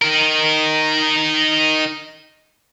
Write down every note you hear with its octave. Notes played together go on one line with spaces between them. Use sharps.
D#4 A#4